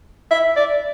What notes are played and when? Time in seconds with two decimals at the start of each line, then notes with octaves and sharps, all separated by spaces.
0.31 E5
0.57 D5